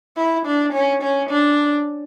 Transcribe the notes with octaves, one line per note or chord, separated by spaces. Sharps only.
E4
D4
C#4
C#4
D4